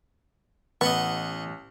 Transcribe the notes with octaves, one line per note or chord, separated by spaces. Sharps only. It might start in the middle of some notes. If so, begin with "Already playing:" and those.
A1 B3 D#5 F#5 C#6